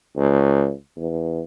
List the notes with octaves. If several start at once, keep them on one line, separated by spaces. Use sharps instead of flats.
C#2
E2